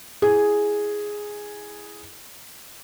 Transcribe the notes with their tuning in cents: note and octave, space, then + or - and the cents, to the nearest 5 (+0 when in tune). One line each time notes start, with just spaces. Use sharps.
E4 +0 G#4 +0